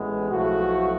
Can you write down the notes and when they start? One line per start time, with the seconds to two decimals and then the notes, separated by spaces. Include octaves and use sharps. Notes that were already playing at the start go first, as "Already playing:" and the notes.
Already playing: A1 A2 G#3 B3
0.30 B1 A2 F3 A3 F#4